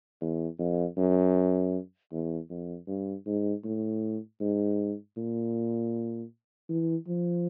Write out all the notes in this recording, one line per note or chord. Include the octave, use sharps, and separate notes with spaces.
E2
F2
F#2
E2
F2
G2
G#2
A2
G#2
A#2
E3
F3